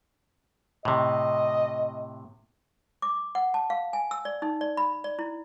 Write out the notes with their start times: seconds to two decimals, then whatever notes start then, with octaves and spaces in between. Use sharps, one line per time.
0.85 A2 C3 D#5
3.02 D6
3.35 F#5
3.54 A5
3.70 F5
3.93 G#5
4.11 E6
4.25 D5
4.42 D#4
4.61 D5
4.77 B5
5.04 D5
5.19 E4